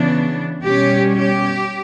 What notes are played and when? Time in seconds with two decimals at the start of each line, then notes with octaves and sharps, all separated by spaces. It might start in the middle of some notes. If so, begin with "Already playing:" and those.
Already playing: C#3 E3 B3 D4
0.62 B2 G3 C#4 G4
1.15 G4